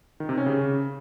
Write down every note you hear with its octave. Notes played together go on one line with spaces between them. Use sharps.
D#3
C3
C#4
C#3